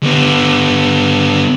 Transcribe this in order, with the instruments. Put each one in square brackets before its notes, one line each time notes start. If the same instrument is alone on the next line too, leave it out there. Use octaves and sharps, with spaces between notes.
[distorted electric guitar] D3 B3